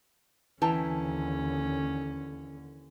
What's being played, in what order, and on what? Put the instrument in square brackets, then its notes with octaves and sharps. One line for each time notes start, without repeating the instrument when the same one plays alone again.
[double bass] D#2 D3 [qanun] E3 E4 G5 [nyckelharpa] C#4 [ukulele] A5 A#5